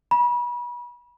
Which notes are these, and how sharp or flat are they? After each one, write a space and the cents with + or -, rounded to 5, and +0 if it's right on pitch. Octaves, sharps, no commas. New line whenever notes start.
B5 -35